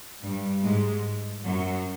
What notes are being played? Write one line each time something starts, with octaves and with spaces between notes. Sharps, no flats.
G2 G3
G#2 G#3
F#2 F#3